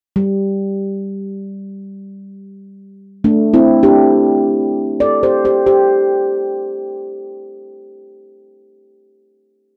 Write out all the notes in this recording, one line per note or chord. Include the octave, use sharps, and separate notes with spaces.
G3
A3 D4
C4 E4
D4 G4
A4 D5
G4 C5
G4 C5
G4 C5